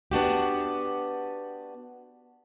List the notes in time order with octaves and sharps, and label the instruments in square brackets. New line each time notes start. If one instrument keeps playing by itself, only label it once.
[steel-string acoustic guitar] B3 D4 F#4 G4